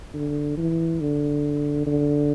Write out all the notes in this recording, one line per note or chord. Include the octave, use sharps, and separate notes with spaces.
D3
E3
D3
D3